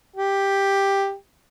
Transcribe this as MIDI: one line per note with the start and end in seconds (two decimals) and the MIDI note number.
0.16 1.13 67